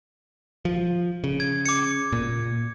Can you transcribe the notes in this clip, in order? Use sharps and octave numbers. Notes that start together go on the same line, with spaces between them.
F3
C#3
G#6
D6 C#7
A#2